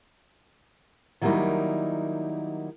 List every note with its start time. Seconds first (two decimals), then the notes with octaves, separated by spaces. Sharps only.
1.21 D#3 F#3 G3 A#3 D#4 E4